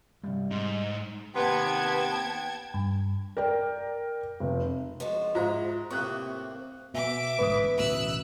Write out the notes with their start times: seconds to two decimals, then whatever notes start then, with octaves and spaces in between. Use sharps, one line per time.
0.23 C2 G2 G3
0.51 G#2 D#4
1.35 D#2 C3 B3 G5 A5 G#6
2.74 G2
3.37 A#4 D5 G5
4.40 F1
5.00 F3 G#3 F#4
5.35 G#2 E4 F4 C5 F5 A#5
5.91 A2 C3 A#3 C4 C#6 D#6 F#6
6.94 B2 B3 E5 D6
7.39 A1 D2 G#2 B4 D#6
7.77 D1 A1 B2 E6 F#6